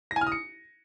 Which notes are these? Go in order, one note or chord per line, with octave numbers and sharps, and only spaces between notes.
A#6
G#5
F6
D#6
C#7